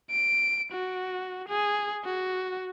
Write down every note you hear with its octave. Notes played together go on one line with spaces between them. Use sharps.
D7
F#4
G#4
F#4